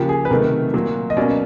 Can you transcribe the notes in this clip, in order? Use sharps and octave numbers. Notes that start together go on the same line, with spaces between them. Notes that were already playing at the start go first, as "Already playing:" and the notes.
Already playing: C#3 F3 A#3 G4
G#4
B4
C3 D#3 F#3 A3 A#4
A#2 F#3 A#3
D#5
B2 F#3 A#3 C#4 D5